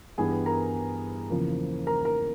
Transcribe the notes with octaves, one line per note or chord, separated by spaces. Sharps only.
G2 E3 G3 B3 G#4 G#5
A#4 A#5
E2 C#3 F3 A#3
A#4 A#5
A#4 A#5